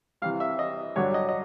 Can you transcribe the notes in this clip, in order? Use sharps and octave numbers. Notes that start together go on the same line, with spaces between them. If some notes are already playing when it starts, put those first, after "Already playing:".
C2 C3 E3 F5
E5
D#5
G2 D3 F#3 C#5
D#5
D#5